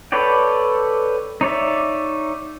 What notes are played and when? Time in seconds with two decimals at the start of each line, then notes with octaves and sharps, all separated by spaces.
0.12 A4 B4 C#5 D5 G5
1.41 D#4 C#5 D5 E5